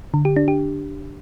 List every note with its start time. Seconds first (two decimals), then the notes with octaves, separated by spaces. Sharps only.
0.14 D3
0.25 G4
0.36 D4
0.48 G4